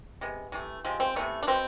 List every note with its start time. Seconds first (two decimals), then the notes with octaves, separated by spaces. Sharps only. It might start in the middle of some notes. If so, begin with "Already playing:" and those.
0.21 C3 G#3 B3
0.52 C3 E3 A3
0.85 C3 F3 G#3 C4
1.00 C4
1.16 C3 E3 A3 B3
1.43 D4
1.47 B2 B3 C4